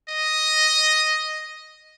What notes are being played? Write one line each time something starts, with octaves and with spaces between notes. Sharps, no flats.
D#5